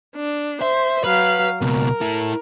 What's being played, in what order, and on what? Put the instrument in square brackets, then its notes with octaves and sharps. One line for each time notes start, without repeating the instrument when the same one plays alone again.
[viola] D4
[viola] C5 [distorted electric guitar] E5
[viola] F#3 F5 [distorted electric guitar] B4
[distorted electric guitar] C#2 B2 [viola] A#4
[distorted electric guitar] E4 A4